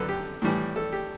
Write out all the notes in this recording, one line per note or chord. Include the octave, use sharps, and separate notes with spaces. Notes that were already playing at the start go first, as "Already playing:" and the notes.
Already playing: F#2 D3 A4 B4
G4
A2 E3 G3
A4
G4